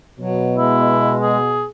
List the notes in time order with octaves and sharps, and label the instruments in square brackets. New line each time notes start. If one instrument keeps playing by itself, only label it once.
[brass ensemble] B2 [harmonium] F#3
[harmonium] G#3 [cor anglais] E4
[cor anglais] G#4